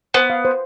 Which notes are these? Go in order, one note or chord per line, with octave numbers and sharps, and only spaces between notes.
B3 C5
F5
C5